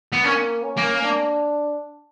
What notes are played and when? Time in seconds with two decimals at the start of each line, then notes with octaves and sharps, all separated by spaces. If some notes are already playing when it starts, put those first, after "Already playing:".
0.13 B3
0.24 A#3 C#4
0.64 C#4
0.77 A#3
1.03 D4